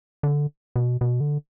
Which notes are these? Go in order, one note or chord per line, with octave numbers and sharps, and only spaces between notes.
D3
B2
B2
D3